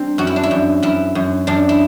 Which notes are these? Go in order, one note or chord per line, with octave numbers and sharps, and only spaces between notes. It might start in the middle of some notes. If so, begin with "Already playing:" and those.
Already playing: G3 C4 D4
F#2 F#4
E4
D4
E4
F#2
F#2 E4
F#2
F#2 D4
E4